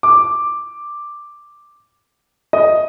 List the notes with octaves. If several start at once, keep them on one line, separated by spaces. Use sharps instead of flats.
D6
D#5